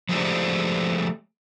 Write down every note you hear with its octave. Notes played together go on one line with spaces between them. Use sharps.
F3 G#3 A3 G4 C5 D5